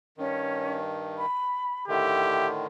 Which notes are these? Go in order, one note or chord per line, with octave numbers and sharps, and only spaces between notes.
G2 D#3 C#4
B5
A2 D3 D#3 G4 E5